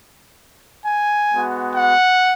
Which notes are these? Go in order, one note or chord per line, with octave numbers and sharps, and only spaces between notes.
G#5
G#3 B3 F#4
F#5